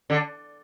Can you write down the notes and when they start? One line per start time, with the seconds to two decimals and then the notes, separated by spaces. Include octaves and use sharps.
0.10 D3